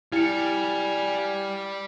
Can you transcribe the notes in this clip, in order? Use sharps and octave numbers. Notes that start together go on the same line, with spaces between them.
G3 E4 F5 G#5 C#7